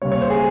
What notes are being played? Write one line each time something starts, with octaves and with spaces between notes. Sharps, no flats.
D#2 C#3 G3 C#5
C#5
C5
G#4